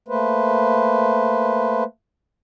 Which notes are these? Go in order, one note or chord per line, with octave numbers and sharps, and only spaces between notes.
A3 A#3 B4 C5